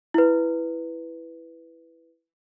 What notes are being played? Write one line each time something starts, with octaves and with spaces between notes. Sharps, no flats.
E4 B4